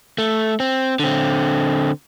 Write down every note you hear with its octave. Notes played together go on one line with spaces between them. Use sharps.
A3
C4
D3 C4